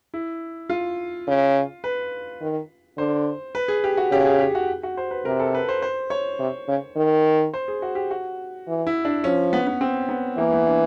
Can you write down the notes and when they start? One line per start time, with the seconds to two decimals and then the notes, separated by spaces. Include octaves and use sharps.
0.14 E4
0.70 F4
1.27 C#3
1.84 B4
2.41 D#3
2.98 D3 C5
3.55 B4
3.68 G#4
3.84 G4
3.97 F#4
4.11 C#3 G4
4.26 G#4
4.40 G4
4.55 F#4
4.83 F#4
4.97 C5
5.11 B4
5.25 C3 A#4
5.40 A4
5.55 B4
5.69 C5
5.82 C5
6.10 C#5
6.39 C3
6.68 C#3
6.96 D#3
7.54 C5
7.68 G#4
7.82 F#4
7.95 G4
8.11 F#4
8.67 E3
8.87 E4
9.05 D4
9.24 F3 C#4
9.53 B3
9.67 B3
9.81 C4
10.09 B3
10.37 E3 A#3
10.52 B3
10.67 D4